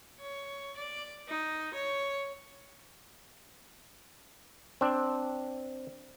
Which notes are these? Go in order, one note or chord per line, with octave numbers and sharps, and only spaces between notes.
C#5
D5
D#4
C#5
C4 D4